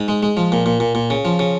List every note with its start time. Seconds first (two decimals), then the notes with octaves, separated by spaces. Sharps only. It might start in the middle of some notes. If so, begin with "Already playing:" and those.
Already playing: G#2
0.08 G#3
0.23 G#3
0.37 F3
0.52 A#2
0.66 A#2
0.80 A#2
0.95 A#2
1.10 C#3
1.25 F3
1.39 C#3